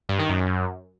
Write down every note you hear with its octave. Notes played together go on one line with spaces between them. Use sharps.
G2
D#3
F#2